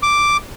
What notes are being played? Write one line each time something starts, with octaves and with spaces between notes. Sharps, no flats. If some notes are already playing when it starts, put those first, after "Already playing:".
D6